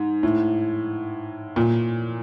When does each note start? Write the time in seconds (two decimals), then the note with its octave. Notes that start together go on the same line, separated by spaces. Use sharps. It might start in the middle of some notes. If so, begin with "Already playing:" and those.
Already playing: G#2
0.23 A2
1.56 A#2